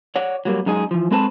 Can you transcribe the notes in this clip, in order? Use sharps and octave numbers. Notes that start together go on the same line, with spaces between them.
C#5 D5 F#5
F#3 G3 A#3
F#2 G#3 D#4 G#4
E3 F3
G#3 C4 A4 B4 C5 A5